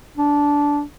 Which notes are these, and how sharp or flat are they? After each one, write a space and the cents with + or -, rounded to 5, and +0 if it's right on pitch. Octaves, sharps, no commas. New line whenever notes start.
D4 -15